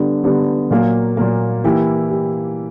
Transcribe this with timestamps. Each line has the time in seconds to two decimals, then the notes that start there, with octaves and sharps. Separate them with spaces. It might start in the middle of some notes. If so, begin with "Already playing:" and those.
Already playing: D3 G3 B3 D4
0.24 D3 G3 B3 D4
0.71 A#2 F#3 A#3
1.17 A#2 F#3 A#3
1.64 E3 A#3 E4 G4
2.11 G4